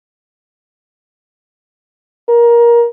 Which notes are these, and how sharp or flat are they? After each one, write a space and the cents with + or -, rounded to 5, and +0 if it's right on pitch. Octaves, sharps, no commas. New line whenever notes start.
A#4 +20